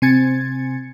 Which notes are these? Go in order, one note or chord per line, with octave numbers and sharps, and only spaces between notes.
C3 C4 G#5 G#6 A6 C#7